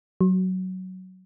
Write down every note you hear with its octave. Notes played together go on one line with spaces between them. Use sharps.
F#3